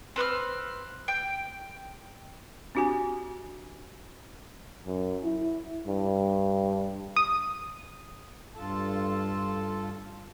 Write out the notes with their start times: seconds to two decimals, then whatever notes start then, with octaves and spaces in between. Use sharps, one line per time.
0.16 C4 B4 C6 F6
1.08 G5
2.75 C4 D4 F#4 G4 G#5
4.86 F#2
5.23 E4
5.88 G2
7.16 D#6
8.56 G2 F4 A4 A5